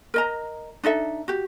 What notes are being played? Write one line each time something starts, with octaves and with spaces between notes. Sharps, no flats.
A#4 D#5 A#5
D4 D#4 A4 E5
F#4 G4